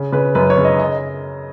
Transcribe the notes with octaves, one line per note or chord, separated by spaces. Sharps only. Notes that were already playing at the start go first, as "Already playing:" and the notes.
Already playing: C#3
C#3 B4
F#2 B4
C#5
C#3
D#5
D#5